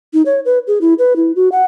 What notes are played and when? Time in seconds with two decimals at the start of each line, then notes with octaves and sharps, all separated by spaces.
0.13 D#4
0.26 C#5
0.45 B4
0.67 G#4
0.81 E4
0.99 B4
1.16 E4
1.36 F#4
1.52 F#5